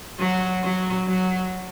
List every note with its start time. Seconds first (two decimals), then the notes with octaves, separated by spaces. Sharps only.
0.18 F#3
0.63 F#3
1.07 F#3